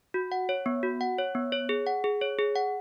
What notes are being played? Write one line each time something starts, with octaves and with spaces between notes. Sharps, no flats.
F#4
F#5
C#5
B3
F#4
F#5
C#5
B3
C#5
G#4
F#5
G#4
C#5
G#4
F#5